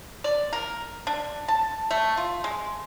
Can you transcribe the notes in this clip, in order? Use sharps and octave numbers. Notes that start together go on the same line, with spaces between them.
D5
A#4
D4
A5
A3
F4
G#3